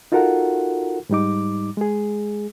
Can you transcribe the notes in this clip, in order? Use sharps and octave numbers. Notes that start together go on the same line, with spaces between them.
D#4 F4 F#4 A4 A#4 F#5
G#2 G3 D#4 D6
G#3 G#4